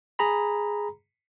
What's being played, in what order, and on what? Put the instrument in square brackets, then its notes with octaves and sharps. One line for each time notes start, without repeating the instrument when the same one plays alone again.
[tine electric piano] G#4 A#5 B5